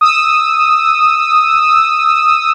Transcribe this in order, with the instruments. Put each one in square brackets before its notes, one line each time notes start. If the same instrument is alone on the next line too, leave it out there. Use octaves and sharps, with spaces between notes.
[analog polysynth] D#6 E6